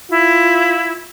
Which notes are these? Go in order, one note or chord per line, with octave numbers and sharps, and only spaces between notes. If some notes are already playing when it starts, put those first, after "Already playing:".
E4 F4